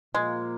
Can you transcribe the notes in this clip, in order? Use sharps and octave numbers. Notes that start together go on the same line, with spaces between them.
A#2 F3 G#3 A#3 F4